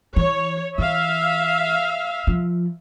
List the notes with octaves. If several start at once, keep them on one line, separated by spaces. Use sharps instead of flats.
E3 C#5
E3 E5 F5
F3